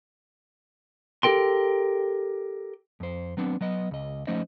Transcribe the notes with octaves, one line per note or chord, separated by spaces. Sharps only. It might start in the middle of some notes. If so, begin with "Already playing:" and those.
G4 A4 A#4 G5 C6
F2 C5
F#3 B3 C4 D4
F#3 B3 D#5
C#2 D#5
F3 A3 C#4 D#4 C5 D#5